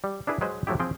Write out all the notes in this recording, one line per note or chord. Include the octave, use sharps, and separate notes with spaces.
G3
D4 E4 G#4 B4
F#3 G#3 B4 C5
F3 F#3 A3 E4 G4
F3 C4 G#4 G5